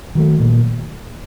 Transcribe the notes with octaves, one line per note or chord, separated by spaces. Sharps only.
D#3 F#3 A3
A#2